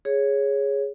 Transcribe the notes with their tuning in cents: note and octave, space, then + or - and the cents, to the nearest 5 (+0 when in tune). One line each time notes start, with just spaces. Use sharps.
G#4 +0 C#5 +0